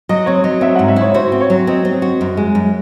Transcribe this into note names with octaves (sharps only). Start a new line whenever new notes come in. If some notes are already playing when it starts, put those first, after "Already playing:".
F#3 D#5
C4 C#5
F#3 D#5
C4 E5
G#2 F#5
E5
E4 C#5
F#4 C5
C4
C#5
F#3
C4 D#5
C4
F#4
F#2
G#3
F#2